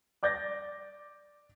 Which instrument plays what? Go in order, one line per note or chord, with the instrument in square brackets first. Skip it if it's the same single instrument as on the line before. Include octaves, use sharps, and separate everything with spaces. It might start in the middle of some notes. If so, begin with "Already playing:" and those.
[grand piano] D5 D6 G6 A6 A#6